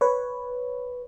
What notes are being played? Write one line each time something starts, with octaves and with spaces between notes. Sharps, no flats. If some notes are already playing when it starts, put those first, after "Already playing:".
B4 C#5